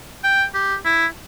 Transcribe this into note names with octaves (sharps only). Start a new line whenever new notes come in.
G5
G4
E4